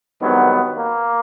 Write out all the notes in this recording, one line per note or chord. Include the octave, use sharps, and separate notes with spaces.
G#1 G2 D#3 F#3 B3
A#3